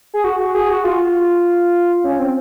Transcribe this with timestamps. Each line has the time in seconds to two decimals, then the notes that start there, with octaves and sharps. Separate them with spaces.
0.14 G#4
0.24 F#4
0.40 F#4
0.55 G#4
0.70 F#4
0.84 F4
2.04 C#4
2.19 C4